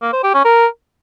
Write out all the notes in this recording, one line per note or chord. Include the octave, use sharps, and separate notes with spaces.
A#3
C5
G4
C#4
A#4